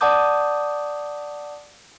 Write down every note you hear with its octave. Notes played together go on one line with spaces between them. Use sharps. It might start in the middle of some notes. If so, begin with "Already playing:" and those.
D5 F#5 A5 D6 D#6 G6